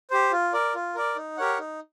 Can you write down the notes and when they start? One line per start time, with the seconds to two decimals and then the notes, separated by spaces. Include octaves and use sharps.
0.11 G4 C5
0.32 F4
0.53 A#4 D5
0.75 F4
0.95 A#4 D5
1.16 D#4
1.37 G4 A#4 C#5 F#5
1.59 D#4